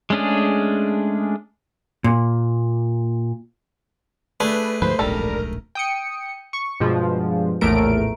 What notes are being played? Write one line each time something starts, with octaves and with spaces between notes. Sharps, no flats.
G#3 A3 C#4 D4 G#4
A#2
A3 D4 G#4 B4
D2 G#2 F3 B4 C5
D1 A#1 G#2 G3 A4 A#4
G5 D#6 C#7
C#6
G2 B2 F3 G#3
A#1 E2 A2 A3 A#4 D7